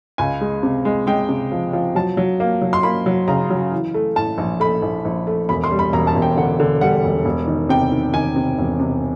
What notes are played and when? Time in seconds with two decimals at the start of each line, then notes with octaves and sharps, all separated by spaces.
0.18 C#2 G#5
0.41 G#3
0.63 C3
0.85 G#3
1.07 G#3 G5
1.29 C3
1.52 F3
1.73 F3
1.95 F#3 A5
2.17 F#3
2.40 A#3
2.61 F#3
2.73 C6
2.83 A#3 B5
3.06 F#3
3.28 C#3 A#5
3.50 F#3
3.72 E3
3.94 A3
4.16 A2 A5
4.38 A#1
4.60 A3 B5
4.82 A#1
5.05 A#1
5.27 A3
5.49 E1 B5
5.64 C6
5.71 G3
5.79 B5
5.93 E1 A#5
6.07 A5
6.15 E1
6.22 G5
6.37 D3 F#5
6.60 D3
6.81 G3 F#5
7.04 E1
7.25 E1
7.47 D#3
7.69 C3 G5
7.92 D#3
8.13 D#3 G#5
8.36 C3
8.58 E1
8.80 C3